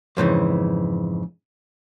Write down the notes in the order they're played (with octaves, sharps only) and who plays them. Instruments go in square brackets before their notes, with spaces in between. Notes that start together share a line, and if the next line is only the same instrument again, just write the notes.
[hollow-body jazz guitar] F2 G#2 C#3 E3